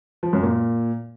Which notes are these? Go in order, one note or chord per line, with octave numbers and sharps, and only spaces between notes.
F3
F#2
A#2